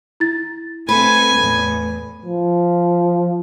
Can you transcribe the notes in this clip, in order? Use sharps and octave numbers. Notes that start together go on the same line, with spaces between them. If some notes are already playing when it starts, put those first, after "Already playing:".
E4 A6
A3 C4 B4 G#5
E2 A2
F3